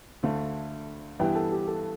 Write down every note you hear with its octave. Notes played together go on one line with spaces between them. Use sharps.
D2 D3 A3 F5
G2 E3 G3 B3 E4 G5
A4
G4
A4